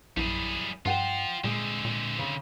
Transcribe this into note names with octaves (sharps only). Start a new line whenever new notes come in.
A#1 F#2 G3 E4 G#4
G2 F4 C5 E5 F#5 G5
A#2 D3 G#3 C4
A#2
C#3